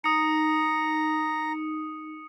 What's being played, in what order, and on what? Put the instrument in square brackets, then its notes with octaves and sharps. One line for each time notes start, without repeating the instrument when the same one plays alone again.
[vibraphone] D#4 [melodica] A#5 [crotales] D#6 C#7